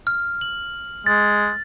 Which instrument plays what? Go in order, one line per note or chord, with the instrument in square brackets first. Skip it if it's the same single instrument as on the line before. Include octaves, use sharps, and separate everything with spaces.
[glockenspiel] F6
F#7
[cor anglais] G#3 [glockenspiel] A6